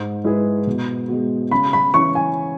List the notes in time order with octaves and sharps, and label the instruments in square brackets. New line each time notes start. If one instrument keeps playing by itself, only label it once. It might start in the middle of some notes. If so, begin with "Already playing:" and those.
Already playing: [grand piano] G#2
G#3 E4 G#4 B4
B2
G#3 B3 F#4
[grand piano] C#3 [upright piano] B5
[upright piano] B5
[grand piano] E3 C#4 [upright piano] C#6
[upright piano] G#5